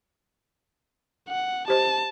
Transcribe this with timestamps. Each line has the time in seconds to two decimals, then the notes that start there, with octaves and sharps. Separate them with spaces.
1.29 F#5
1.68 G4 C5 D#5 A5